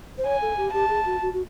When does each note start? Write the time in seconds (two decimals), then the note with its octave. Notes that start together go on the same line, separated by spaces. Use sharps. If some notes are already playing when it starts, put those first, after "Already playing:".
0.18 C5
0.25 C#5 G#5
0.42 A4
0.57 G4
0.73 G4 A5
0.89 G#4
1.05 F#4
1.22 F#4
1.34 F#4